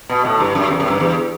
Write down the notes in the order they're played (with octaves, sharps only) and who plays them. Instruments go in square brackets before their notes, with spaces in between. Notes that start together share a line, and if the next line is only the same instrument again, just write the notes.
[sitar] B2
A2
G2
F#2
E2
F#2
G2
E2